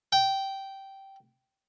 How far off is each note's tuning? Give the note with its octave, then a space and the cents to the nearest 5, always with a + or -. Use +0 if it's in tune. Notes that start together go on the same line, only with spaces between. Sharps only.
G5 -10